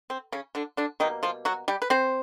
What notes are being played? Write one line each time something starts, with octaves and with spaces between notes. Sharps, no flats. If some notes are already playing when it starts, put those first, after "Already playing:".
C4
C#3 C#4
D3 D4
D3 D4
B2 D#3 G3 A#3 D#4
F3 F4
F#3 F#4
G3 G4
B4
C4 C5